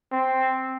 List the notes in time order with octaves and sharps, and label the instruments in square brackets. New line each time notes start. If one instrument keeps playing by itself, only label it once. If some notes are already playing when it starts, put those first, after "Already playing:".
[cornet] C4